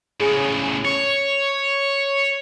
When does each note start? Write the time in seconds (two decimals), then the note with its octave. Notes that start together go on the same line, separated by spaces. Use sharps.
0.20 A2 C#3 G#4
0.85 C#5 C#6